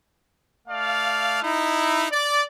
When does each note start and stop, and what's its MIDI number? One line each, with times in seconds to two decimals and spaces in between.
0.68 1.41 57
0.68 1.41 74
0.68 1.41 77
1.43 2.06 63
1.43 2.06 64
2.12 2.44 74